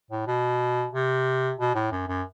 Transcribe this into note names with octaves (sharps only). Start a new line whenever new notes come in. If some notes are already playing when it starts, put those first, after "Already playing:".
A2
B2
C3
B2
A2
F#2
F#2